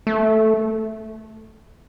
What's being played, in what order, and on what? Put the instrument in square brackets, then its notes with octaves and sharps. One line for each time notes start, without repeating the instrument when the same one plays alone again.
[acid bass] A3